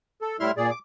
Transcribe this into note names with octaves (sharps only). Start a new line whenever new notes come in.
A4
A2 G3 E4 E5 C6 F6
A#2 G#4 D5
D6